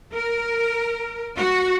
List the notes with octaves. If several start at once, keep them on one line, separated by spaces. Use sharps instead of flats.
A#4
F#4